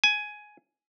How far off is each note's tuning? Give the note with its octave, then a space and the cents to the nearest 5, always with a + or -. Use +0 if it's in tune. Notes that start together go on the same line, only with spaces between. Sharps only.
G#5 +10